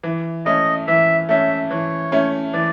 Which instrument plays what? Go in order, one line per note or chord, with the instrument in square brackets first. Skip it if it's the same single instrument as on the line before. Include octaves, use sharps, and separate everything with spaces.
[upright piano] E3
[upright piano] A3 C#4 E4 [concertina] D#5
[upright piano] E3 [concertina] E5
[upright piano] A3 C#4 E4 [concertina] E5
[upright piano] E3 [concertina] C#5
[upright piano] A3 C#4 E4
[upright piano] E3 [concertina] D5